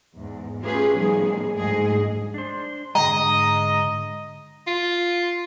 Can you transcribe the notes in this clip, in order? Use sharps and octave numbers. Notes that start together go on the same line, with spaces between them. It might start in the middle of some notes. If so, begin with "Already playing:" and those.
E2 G#2
A3 C#4 F4 G4 G#4 B4
A2 D#3 F3 G3 B3 G#4
D2 G#2 F3 G#4 D#5
D4 C5
G#2 D3 G#3 D#5 A#5
F4